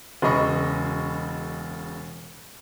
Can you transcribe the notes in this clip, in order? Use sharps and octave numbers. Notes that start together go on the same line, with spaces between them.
E1 C#3 G#4 D#5 B5 C#6